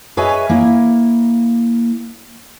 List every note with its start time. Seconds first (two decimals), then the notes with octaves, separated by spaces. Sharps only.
0.17 G#4 B4 C#5 D#5 E5 G#5
0.49 A#3 E4